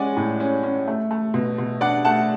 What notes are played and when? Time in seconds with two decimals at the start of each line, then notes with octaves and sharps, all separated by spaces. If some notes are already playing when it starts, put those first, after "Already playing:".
Already playing: G#3 C#4 D5 F#5 G#5
0.17 A2
0.40 C#4
0.63 C#4
0.88 A3
1.11 A3
1.34 B2
1.58 B2
1.81 D4 D5 F#5
2.05 A3 F#5 A5